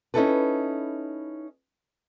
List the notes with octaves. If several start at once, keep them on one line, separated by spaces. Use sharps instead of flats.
C#4 D#4 E4 G4 A4 B4